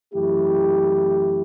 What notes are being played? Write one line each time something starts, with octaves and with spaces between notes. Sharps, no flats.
F#2 E3 A3 E4 G4